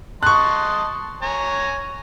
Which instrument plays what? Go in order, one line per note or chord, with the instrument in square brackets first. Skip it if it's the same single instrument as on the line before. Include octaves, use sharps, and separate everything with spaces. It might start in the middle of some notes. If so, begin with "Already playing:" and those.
[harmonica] D#5 A5 C6 [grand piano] C#6 F#6
[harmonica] C#5 G#5 A#5